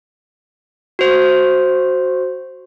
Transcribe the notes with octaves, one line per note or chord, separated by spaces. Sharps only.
F#4 C5